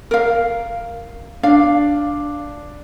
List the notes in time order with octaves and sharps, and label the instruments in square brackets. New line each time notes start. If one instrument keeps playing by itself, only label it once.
[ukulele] A#4 F5
[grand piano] D4 [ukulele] F5